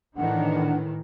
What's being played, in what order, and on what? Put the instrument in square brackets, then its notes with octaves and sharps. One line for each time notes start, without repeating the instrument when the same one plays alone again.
[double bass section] A2 D#3 E3 [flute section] D4 F#5